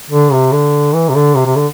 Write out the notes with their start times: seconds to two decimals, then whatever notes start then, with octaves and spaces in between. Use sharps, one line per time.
0.10 D3
0.32 C3
0.52 D3
0.94 E3
1.09 C3
1.15 D3
1.35 C3
1.46 C3
1.56 D3